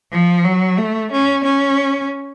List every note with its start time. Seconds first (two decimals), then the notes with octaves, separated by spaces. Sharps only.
0.12 F3
0.44 F#3
0.78 A3
1.11 C#4
1.44 C#4